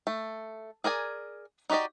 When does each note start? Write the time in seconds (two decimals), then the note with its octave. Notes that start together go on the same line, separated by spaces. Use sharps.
0.07 A3
0.84 G#4 A#4 D5 G#5
1.70 D#4 F#4 G4 D5 D#5